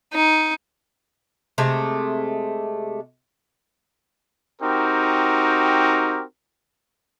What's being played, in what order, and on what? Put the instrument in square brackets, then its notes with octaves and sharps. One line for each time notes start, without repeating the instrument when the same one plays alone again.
[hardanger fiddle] D#4
[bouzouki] C3 G#3 A3
[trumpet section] C4 D#4 F#4 G4 A#4